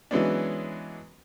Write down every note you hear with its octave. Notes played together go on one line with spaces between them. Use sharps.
E3 F#3 G#3 B3 C#4 D4